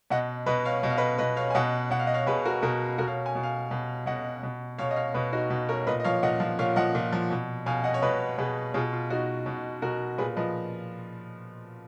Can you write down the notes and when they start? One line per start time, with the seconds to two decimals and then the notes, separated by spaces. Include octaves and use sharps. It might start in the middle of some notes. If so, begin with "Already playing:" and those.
0.10 B2 D#5 F#5
0.46 B2 B4 D#5
0.65 C#5 F5
0.83 B2 D#5
0.90 F5
0.97 B4 D#5
1.18 B2 B4 D#5
1.37 C#5 F5
1.50 G#5
1.54 B2 D#5 F#5
1.90 B2 F#5
1.99 F5
2.07 D#5
2.14 C#5 F5
2.27 B2 G#4 B4
2.45 F#4 A#4
2.62 B2 F#4 A#4
2.98 B2 F#4 A#4
3.07 C#5 F5
3.26 G#5
3.35 B2
3.43 F5 G#5
3.71 B2
4.06 B2 D#5 F#5
4.43 B2
4.78 B2 C#5 F5
4.91 D#5
4.96 C#5 F5
5.14 B2 B4 D#5
5.33 D#4 F#4
5.50 B2 D#4
5.69 A#4 C#5
5.87 A#2 B4 D#5
6.00 D#5
6.04 F3 C#5 F5
6.23 A#2 D#5 F#5
6.40 F3
6.59 A#2 C#5 F5
6.76 F3 D#5 F#5
6.95 A#2
7.13 F3
7.31 B2
7.66 B2 F5 G#5
7.84 D#5 F#5
7.94 C#5
8.02 B2 B4 D#5
8.38 B2 G#4 B4
8.74 B2 F4 G#4
8.93 F4
9.10 B2 D#4 F#4
9.46 B2
9.82 B2 F#4 A#4
10.18 A#2 G#4 B4
10.36 F3 B4 D#5